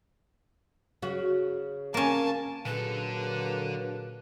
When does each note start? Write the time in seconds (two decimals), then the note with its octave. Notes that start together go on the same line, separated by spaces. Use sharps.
1.02 C#3 F#4
1.94 A#3 C#4 G#5 A5
2.66 A#2 D3 F#3 A#3 G#4 A4 B4